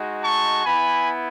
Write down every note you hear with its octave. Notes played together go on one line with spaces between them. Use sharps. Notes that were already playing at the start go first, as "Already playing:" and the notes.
Already playing: G#3 D#4 F#4
A5 C#6
B3 E4 G#5 B5